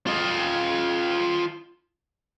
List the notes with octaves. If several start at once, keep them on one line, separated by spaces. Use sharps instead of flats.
F4 D#5